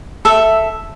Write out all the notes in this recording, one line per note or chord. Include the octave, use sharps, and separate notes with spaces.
A4 E5